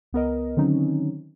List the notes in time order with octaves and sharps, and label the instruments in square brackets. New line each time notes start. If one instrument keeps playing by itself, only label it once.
[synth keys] C#2 B3 A#4 D#5
D3 D#3 F#3 C4 C#4 D#4